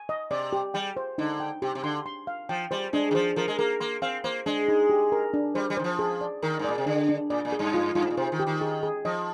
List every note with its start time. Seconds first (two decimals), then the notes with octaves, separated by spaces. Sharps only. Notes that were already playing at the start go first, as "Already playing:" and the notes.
Already playing: G#5
0.09 D#5
0.31 C3 D5
0.53 G4
0.74 G3 G5
0.97 C5
1.18 D3 D#4
1.40 G5
1.62 C3 G4
1.75 C3
1.83 D3 C6
2.06 C6
2.27 F5
2.49 F3 G5
2.71 G3 C5
2.93 G#3 D4
3.11 D#3
3.15 F3 C5
3.36 F3 A#4
3.48 G#3
3.59 A#3 A#4
3.80 A#3 C6
4.02 C4 F5
4.24 A#3 C5
4.46 G#3 D4
4.68 D#4
4.90 G4
5.12 A#4
5.34 D4
5.55 G3 C5
5.70 G3
5.77 D#3 C5
5.84 F3
5.99 G#4
6.21 D5
6.43 D#3 A#4
6.59 G#2
6.65 A#2 D5
6.78 C3
6.86 D3 D4
7.09 D4
7.30 A#2 D5
7.45 A#2
7.52 G#4
7.59 G2
7.74 F4
7.95 G2 F4
8.02 G#2
8.10 A#2
8.17 C3 C5
8.32 D#3
8.40 G4
8.47 D#3
8.61 G#4
8.83 G#4
9.05 F3 D#5